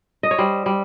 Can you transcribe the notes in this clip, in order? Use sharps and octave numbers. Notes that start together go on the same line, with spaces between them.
D#5
C#5
G3 C5
G3